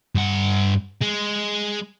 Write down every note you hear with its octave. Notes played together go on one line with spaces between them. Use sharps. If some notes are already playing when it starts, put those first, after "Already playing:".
G2 F#5
G#3